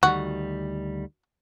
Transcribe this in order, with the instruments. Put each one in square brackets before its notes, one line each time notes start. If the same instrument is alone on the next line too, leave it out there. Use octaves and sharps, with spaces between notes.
[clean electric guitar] D2 D#3 G3 [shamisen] F#4